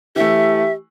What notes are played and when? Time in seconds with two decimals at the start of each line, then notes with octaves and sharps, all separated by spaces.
0.16 E3 A3 G4 E5